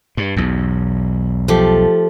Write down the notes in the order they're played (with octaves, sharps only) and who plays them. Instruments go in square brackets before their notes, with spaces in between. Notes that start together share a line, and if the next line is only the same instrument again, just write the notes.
[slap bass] G2
B1 E2
[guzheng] F3 A3 G4